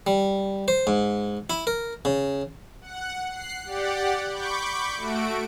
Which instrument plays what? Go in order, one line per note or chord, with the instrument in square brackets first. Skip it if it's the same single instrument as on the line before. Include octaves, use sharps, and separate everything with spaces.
[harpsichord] G3
C5
G#2
E4
A#4
C#3
[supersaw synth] F#5
F#6 C7
G4 D5 F#5
B5 C#6 D6 G6
A3 F#4 D7